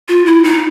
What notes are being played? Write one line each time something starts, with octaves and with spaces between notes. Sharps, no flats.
F4
E4
D#4